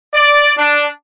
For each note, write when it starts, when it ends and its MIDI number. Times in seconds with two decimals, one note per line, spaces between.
0.14 0.51 74
0.58 0.86 62